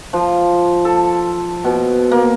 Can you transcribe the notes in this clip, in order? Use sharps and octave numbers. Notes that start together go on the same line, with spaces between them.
F3
A4
B2
A#3